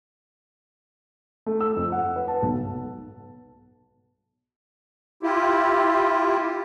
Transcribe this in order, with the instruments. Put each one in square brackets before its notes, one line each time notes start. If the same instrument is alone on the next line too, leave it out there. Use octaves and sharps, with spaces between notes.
[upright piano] A3
E6
F2
F#5
B4
A5
B1
[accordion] E4 F4 G4